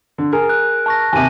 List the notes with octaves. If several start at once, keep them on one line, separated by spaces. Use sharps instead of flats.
D3
G#4 A#4
F#6
A5 C#6 A#6
D#2 C3 G#5 D#7